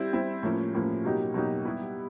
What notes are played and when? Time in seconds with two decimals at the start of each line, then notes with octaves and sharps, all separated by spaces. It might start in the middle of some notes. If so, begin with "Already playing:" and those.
Already playing: G3 C4 E4
0.13 G3 C4 E4
0.43 A2 F3 A#3 C#4
0.74 A2 F3 A#3 C#4
1.04 B2 F#3 A#3 D#4 G4
1.34 B2 F#3 A#3 D#4 G4
1.65 G3 B3 E4 G4